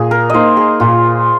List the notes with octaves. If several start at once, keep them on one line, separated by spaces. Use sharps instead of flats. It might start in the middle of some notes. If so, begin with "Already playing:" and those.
Already playing: A#2 G#4
A#4
A#3 D#4 C5 D#5
G#4
A#2 F4